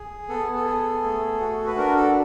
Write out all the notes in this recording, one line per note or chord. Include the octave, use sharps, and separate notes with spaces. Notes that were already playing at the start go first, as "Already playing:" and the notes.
Already playing: G#4
B3 A4
A4
G#4
A3
F#4
B4
D4 A#4
A4